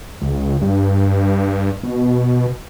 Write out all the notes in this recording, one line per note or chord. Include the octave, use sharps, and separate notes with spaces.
C#2
G2
B2